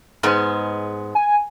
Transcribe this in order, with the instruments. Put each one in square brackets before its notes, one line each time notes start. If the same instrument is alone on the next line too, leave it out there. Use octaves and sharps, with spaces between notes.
[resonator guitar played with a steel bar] G#2 G#3 B3
[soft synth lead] G#5